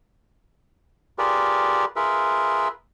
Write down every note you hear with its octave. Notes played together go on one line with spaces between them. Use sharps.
F4 G4 G#4 A#4 B4 D5
F4 G#4 A#4 B4 E5